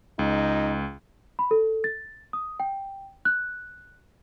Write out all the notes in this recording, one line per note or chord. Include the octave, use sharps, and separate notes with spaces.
C#2 D#4
B5
A4
A6
D#6
G5
F#6